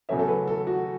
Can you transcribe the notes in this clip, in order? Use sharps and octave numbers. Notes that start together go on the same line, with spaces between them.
E2 C#3 F#3 A3 C#4 E5
A4
B4
A4
F#4